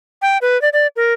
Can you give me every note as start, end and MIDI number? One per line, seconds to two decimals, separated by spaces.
0.22 0.38 79
0.42 0.60 71
0.62 0.69 74
0.73 0.87 74
0.96 1.14 70